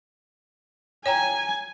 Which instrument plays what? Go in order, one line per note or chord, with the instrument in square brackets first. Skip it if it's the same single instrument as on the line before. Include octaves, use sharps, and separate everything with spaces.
[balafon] C#5 G5 A#5 [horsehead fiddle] G#5